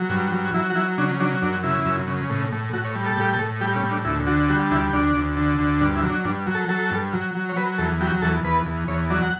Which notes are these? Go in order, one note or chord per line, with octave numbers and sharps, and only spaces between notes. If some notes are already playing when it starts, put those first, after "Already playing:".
Already playing: F#3
G2
F#3
F#3 E4
F#4
F#3 E4
C#3 D4
F#3 D4
F#2 D4
C#3 E4
F#2
C#3
A2
A2
A2 F#4
C#5
G3
A4
A2 G4
A4
A2
G3 G4
C#4
A2
D4
D2 E4
D3 F#4
G3 F#4
D2 E4
D2 D4
D2
D3
D2
G2 D4
E4
F#3
D4
G2 D4
F#3
A4
F#3 A4
G2
F#3
F#3
C#5
F#3 B4
E2 A4
F#3 G4
E2 A4
E2 B4
E2
E2 C#5
F#3 D5
F#5